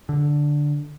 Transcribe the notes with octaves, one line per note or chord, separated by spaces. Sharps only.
D3